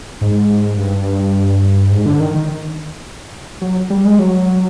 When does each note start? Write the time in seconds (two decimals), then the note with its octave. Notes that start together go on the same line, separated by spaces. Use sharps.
0.21 G#2
0.78 G2
1.91 G#2
2.06 D3
2.20 D#3
2.35 D#3
3.61 F#3
3.90 G3
4.05 G#3
4.19 F#3